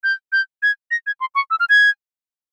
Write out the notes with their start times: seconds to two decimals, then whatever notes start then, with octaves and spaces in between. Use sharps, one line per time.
0.04 G6
0.32 G6
0.63 G#6
0.91 A#6
1.07 G#6
1.20 C6
1.35 C#6
1.51 E6
1.60 F6
1.69 G#6